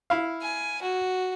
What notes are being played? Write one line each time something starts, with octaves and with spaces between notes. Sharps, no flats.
E4 F5
G#5
F#4